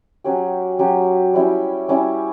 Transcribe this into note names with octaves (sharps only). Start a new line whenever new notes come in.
F#3 C#4 G4
F#3 C#4 G4
G3 C#4 E4
G3 C#4 E4